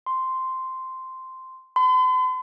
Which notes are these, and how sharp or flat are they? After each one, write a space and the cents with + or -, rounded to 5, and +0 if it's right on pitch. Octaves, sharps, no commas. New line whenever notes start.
C6 -5
C6 -45